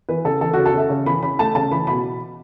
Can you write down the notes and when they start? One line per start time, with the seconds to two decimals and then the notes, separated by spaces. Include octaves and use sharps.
0.09 E3 B4
0.25 C#3 A4
0.41 E3 A4
0.53 C#3 F#4
0.66 A4
0.74 C#3 E5
0.90 C#3
1.06 E3 B5
1.22 C#3 B5
1.39 A3 A5
1.55 C#3 A5
1.71 E3 B5
1.87 B2 B5